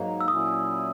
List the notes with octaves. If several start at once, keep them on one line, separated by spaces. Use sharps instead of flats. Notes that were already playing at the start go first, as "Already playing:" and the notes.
Already playing: G#2 F#3 A#3 D#4
E6
A#2 F#3 C#4 E4 D#6